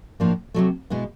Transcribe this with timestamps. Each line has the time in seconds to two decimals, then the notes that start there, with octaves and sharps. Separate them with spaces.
0.20 A2 F3 A#3 D4 F4
0.54 C3 D#3 F#3 A3
0.90 B2 G#3 B3 E4